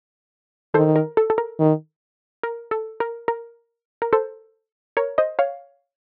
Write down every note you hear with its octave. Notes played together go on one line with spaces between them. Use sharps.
D#3 A4 C5
A#4
A4
A4
A#4
D#3
A#4
A4
A#4
A#4
A#4
A4 C5
A#4 C#5
C5 D#5
C#5 F5